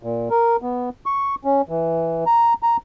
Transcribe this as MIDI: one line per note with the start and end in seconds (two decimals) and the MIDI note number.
0.03 0.29 46
0.30 0.57 70
0.62 0.89 59
1.06 1.35 85
1.45 1.62 61
1.69 2.24 52
2.26 2.54 82
2.63 2.77 82